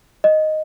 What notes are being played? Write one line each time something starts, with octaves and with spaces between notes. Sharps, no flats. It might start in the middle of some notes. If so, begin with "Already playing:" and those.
D#5